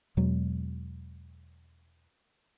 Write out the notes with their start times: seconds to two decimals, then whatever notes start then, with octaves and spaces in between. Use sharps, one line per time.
0.17 E2 B2 F#3 G#3